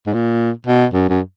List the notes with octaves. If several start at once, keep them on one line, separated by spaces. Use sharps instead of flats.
G#2
A#2
B2
F#2
F#2